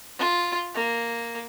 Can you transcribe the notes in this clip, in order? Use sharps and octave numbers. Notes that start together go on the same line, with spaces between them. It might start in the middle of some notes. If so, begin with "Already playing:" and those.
F4
A#3